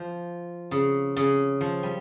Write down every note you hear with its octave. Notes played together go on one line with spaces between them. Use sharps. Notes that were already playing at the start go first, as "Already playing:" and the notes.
Already playing: F3
C#3
C#3
F3
G3